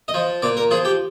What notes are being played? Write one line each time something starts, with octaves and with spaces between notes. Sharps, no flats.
D#5
F3
A#2 D5
A#4
F3 G#4
G4